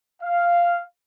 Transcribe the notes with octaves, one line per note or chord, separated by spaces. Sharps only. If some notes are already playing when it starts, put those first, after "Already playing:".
F5